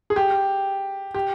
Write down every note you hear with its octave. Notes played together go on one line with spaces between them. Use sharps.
G#4
G4
G4